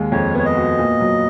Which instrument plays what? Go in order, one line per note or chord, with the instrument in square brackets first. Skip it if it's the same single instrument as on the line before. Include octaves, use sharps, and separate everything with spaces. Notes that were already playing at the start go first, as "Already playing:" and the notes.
Already playing: [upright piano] D#2 G#3
[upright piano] F2 [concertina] C#5
[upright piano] B3 [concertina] C#5
[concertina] D#5
[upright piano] F#4
A#2
F#3